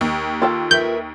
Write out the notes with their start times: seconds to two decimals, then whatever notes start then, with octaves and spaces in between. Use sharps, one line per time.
0.01 D#2 G4
0.42 F4 A4 G5
0.71 A#4 B4 E5 G6